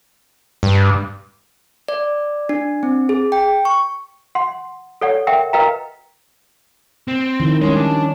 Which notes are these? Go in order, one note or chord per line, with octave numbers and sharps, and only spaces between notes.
G2
D5
D4
C4
G#4
G5
C#6
F#5 C6
A4 C#5 D5 F#5
A#4 E5 F#5 G5
A#4 B4 D#5 F5 G5 A#5
C4
D#3 F3 E4
G3 G#3 C#4 C#5 C6
D4